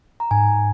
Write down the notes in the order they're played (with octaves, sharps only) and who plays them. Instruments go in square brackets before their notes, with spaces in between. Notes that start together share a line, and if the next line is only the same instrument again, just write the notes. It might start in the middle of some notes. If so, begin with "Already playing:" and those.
[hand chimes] A#5
[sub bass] G#2 [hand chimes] G#5